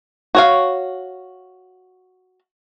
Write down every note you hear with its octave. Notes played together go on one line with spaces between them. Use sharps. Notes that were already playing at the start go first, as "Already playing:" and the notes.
F#4 C#5 F5